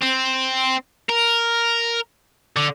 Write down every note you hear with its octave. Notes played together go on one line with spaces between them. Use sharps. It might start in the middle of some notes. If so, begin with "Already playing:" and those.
C4
A#4
D3